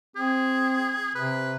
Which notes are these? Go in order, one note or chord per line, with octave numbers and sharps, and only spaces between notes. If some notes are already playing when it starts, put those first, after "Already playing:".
C4 G#4
C3 B4